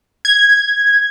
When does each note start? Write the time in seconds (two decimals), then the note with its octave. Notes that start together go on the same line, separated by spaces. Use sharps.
0.25 G#6